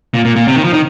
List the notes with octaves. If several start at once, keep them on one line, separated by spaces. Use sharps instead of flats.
A#2
A#2
A#2
C3
D#3
F3
D#3